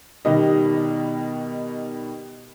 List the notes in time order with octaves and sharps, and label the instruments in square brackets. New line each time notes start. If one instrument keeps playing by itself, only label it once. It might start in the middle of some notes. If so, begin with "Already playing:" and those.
[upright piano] B2 D#3 G3 G4 D#5